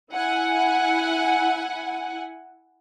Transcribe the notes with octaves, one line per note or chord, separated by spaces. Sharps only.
E4 F#5 G#5